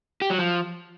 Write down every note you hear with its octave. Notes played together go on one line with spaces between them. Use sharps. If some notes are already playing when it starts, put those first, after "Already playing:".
G4
F#3
F3